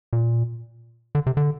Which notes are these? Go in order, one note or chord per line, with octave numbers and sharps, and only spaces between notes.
A#2
D3
C3
D3